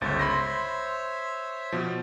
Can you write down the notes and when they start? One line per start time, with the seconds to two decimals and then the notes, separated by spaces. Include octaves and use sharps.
0.01 G1 C#2 C5 C#5 E5 A6
0.19 B5 C6 A#6
1.72 B2 F3